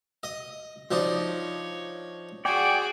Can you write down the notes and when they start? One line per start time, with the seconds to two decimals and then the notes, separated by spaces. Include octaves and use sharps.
0.23 D#5
0.91 F3 D4 D#4 C#5
2.45 F#4 G#4 D5 G5 G#5